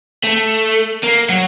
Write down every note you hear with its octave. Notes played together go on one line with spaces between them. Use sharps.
A3
A#3
F#3